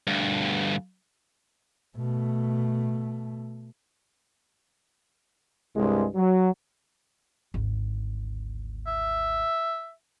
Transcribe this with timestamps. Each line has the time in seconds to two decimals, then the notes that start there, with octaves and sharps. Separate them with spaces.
0.07 D2 G2
1.96 B2 A3
5.76 C2 G2 G#3
6.15 F#3
7.54 G#1 D2
8.87 E5